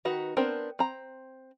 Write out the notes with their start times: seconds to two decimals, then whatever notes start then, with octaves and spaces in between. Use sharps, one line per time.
0.05 D#3 D#4 F#4 B4
0.37 B3 C4 D4 A#4 C5
0.79 C4 A#5